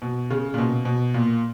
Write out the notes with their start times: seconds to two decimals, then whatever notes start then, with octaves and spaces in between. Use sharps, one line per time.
0.02 B2
0.30 C#3
0.54 A#2
0.58 B2
0.85 B2
1.14 A#2